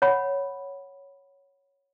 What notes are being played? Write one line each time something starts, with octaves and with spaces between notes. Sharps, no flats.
C#5 F#5 B5